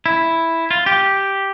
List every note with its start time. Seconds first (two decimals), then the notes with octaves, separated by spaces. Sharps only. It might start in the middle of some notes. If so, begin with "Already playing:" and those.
0.06 E4
0.71 F4
0.86 G4